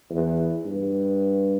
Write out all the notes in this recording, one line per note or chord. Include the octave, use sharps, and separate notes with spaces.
E2
G2